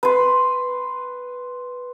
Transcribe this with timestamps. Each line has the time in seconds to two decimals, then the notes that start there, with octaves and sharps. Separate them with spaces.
0.03 B4 C6